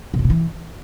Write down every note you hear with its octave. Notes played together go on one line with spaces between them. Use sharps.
B2
F#2
B2
E3